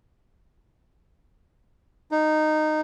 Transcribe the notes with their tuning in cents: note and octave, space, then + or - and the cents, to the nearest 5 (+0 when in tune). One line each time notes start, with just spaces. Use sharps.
D#4 -15